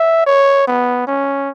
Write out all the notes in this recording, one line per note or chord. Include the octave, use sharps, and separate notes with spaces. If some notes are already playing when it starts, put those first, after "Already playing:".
Already playing: E5
C#5
B3
C#4